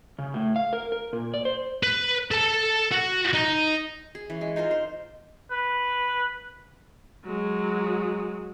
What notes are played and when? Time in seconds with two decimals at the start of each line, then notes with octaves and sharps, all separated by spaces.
0.19 C#3
0.34 A2
0.56 F5
0.73 A#4
0.92 A#4
1.13 A#2
1.34 D5
1.45 C5
1.83 B4
2.31 A4 A5
2.91 F#4
3.33 D#4
4.15 G#4
4.30 E3 C#4
4.41 G#3
4.56 D#4 F4 A#4 C5
4.71 C5
5.51 B4
7.25 F#3 G#3